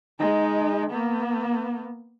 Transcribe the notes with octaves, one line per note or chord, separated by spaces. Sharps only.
G#3 D#4
A#3 B3